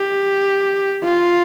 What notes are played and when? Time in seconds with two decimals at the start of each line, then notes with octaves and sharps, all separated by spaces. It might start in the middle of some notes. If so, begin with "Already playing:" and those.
Already playing: G4
1.04 F4